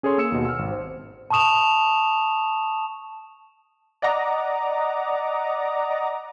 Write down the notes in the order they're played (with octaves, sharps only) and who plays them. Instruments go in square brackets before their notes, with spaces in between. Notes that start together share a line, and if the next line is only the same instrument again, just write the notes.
[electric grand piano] C#4 G#4 A4 C#5 C6
A#3 E6 C#7 E7
D#2 B2
E6 F6
G#1
C5
[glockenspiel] A5 B5 C#6 D#6 E7 F7
[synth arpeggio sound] D5 D#5 F#5 A#5 D6 D#6